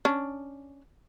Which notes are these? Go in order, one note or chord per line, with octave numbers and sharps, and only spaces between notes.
C#4 D4